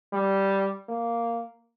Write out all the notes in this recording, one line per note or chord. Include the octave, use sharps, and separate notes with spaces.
G3
A#3